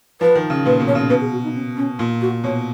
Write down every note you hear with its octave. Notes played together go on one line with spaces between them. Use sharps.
F3 B4
D#3
C#3
A#2 B4
B2
C#5
C#3
B2 B4
G#4
F#4
D#4
C#4
C#4
A#2 F4
F#4
B2 C#5